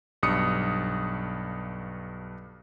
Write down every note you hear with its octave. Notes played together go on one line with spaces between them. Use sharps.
B1 G2 D#6 C#7